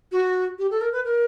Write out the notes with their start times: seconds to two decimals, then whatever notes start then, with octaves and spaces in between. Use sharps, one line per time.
0.12 F#4
0.59 G4
0.71 A4
0.81 A#4
0.93 B4
1.05 A#4